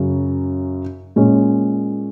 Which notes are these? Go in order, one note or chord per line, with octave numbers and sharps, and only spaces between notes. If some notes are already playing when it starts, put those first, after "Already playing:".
Already playing: F#2 C#3 F#3 C#4
A#2 G#3 C#4